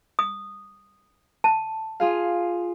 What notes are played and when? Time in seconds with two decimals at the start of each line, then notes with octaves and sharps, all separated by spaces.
0.19 D#6
1.44 A5
2.00 F4 G#4 F5